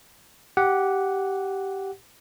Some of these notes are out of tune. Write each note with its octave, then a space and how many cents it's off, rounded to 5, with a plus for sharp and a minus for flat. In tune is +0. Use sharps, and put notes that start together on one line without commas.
G4 -10 F#5 +0